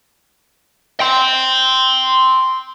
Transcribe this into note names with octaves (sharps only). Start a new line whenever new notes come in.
G5 C6